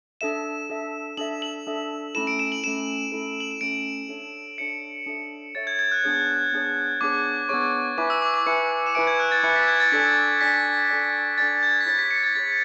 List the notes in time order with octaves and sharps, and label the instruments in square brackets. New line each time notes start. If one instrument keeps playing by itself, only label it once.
[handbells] D4 A4 E5 [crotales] E7
[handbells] D4 A4 E5
[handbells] D4 A4 E5 [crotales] F#7
[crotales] F#7
[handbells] D4 A4 E5
[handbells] A3 C#4 E4 A4 [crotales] E7
[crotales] D7
E7
F#7
[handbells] A3 C#4 E4 A4 [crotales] E7
[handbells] A3 C#4 E4 A4
[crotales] F#7
E7
[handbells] A3 C#4 E4 A4 [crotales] D7
[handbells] D4 A4 C#5 E5
[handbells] D4 A4 C#5 E5 [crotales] C#7
[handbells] D4 A4 C#5 E5
[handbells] D4 A4 C#5 E5 [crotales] A6
[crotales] G#6
G#6
F#6
[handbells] B3 D4 G#4 C#5
B3 D4 G#4 C#5
[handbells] B3 D4 G#4 C#5 [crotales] D6
[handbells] B3 D4 G#4 C#5 [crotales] C#6
[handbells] E4 B4 E5 G#5 [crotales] D6
[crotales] E6
D6
D6
[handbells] E4 B4 E5 G#5 [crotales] C#7
[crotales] E7
[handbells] E4 B4 E5 G#5 [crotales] D7
[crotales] G#6
F#6
A6
[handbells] E4 B4 E5 G#5 [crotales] C#7
[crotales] B6
G#6
A6
[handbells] D4 A4 D5 G#5 [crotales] B6
[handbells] D4 A4 D5 G#5 [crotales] B6
[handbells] D4 A4 D5 G#5
[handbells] D4 A4 D5 G#5 [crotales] A6
[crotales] G#6
B6
[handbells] E4 G#4 C#5 [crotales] A6
[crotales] B6
C#7
G#6
A6
[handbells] E4 G#4 C#5 [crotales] A6